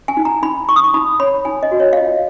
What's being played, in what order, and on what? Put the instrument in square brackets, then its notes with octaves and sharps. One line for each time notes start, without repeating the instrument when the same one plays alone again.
[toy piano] G#5
D#4
A#5
D#4 B5
D#4 C#6
D#6
C#6
D#4 B5
C#5 B5
D#4 G#5
D#5
F#4
C#5
F5
F4 D#5